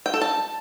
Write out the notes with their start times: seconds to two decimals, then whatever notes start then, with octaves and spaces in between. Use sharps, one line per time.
0.06 G5
0.14 A4
0.21 A5